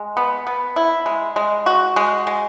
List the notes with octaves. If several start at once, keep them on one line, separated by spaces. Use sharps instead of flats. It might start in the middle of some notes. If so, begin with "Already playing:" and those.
Already playing: G#3
B3
B3
E4
G#3
G#3
F#4
G#3
G#3